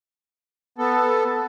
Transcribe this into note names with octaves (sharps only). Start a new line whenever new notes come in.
B3 A4